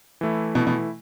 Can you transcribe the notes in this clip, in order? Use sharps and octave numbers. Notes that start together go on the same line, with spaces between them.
E3 A3 E4
B2 E3 A3 E4
B2